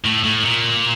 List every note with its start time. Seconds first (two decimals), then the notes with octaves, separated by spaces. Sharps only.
0.06 A2
0.25 A2
0.45 A#2